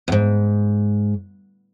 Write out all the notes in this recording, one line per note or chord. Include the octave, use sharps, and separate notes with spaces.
E2 G#2